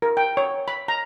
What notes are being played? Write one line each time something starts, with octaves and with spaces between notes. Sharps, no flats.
A#4
G5
C#5
B5
A#5